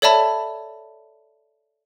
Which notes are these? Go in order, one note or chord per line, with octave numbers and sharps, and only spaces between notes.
A4 C#5 D5 E5 A5 B5